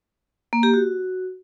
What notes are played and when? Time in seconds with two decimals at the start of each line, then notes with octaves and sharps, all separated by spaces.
0.53 A#3
0.63 G4
0.74 F#4